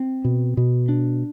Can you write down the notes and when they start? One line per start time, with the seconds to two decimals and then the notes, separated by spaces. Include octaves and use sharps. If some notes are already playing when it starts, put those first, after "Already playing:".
Already playing: C4
0.24 B2
0.57 B2
0.89 D4